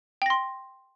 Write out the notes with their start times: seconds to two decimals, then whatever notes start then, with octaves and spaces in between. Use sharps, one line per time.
0.22 G5
0.26 A#6
0.30 C6